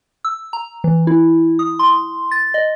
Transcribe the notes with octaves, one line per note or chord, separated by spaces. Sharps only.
E6
A#5
E3
E4
D#6
C6
A6
D#5